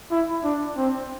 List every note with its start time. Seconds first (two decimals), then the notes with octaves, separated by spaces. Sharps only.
0.11 E4
0.44 D4
0.77 C4